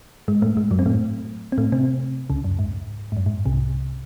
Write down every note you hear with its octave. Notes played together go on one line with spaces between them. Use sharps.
G#2 G#3
A2 A3
G#2 G#3
F#2 F#3
C4
A2 A3
C4
A2 A3
C3 C4
C#2 C#3
F#2
G#2
G#2
F#2
G#2
C2 C3